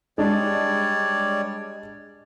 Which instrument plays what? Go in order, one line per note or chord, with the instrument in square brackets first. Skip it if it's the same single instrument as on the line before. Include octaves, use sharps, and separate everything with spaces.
[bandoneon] G3 C#5 D5 [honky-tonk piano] G#3 D4